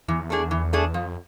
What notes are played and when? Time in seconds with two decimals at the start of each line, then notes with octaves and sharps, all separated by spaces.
0.08 E2 E3
0.30 A3 D4 G#4
0.51 E3
0.73 A3 D4 G#4
0.94 F2 F3